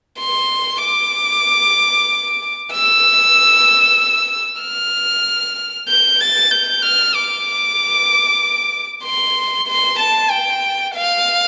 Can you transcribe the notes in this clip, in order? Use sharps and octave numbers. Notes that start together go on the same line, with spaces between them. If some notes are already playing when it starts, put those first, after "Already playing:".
C6
D6
E6
F6
G6
A6
G6
F6
D6
C6
C6
A5
G5
F5